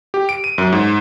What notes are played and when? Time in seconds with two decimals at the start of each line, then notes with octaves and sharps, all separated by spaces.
0.14 G4
0.29 D7
0.44 D#7
0.58 F#2
0.72 G#2